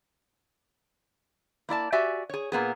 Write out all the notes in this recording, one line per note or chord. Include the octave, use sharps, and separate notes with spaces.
A#3 E4 D5 A5
F#4 G4 D5 E5 G#5
G#4 C#5
A#2 A#3 B3 G#4